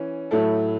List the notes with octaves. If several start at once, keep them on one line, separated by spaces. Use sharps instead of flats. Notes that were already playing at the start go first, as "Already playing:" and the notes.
Already playing: E3 C#4
A2 F#3 A3 E4 A4